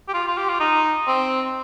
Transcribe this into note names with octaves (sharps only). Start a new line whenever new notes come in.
G4
F4
F4
G4
F4
D#4
C4